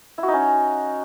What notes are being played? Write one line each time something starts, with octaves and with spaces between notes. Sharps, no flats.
E4
F#4
D#4
C#4